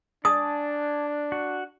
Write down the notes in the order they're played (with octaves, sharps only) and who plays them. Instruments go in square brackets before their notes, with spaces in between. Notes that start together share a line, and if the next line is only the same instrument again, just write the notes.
[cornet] D4 [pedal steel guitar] D5 G#5 A5 [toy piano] D#6
[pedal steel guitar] F#4